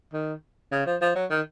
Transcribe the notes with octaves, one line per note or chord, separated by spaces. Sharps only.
D#3
C#3
F3
F3
F#3
D#3